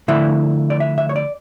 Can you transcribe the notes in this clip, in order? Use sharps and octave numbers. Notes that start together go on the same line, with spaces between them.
D3 F3 A3 E4 E5
D5
E5
E5
C#5
D5